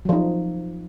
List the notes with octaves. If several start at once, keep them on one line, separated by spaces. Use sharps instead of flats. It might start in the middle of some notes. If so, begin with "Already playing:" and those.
F3 F#3 D#4